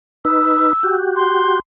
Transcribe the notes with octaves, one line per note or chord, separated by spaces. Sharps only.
D#4 B4 E6
F#4 G4
C6